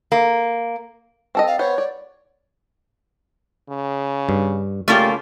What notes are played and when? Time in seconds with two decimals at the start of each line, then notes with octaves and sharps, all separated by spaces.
0.12 A#3
1.35 C4 A4 D#5
1.47 F5
1.59 B3 C5 C#5
1.78 D5
3.69 C#3
4.29 G2
4.88 C#3 A3 A#3 F4 G4 D5